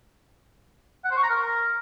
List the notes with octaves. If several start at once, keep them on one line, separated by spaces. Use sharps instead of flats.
F#5
C5
C#6
A#5
A#4